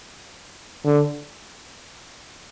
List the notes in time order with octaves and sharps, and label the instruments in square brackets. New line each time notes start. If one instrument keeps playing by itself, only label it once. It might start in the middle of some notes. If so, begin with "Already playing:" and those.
[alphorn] D3